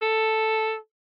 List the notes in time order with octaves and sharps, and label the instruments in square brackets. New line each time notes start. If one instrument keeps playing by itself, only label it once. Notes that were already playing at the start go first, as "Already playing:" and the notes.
[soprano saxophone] A4